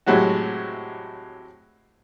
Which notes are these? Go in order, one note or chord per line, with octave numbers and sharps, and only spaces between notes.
A2 C3 F#3 G#3 F#4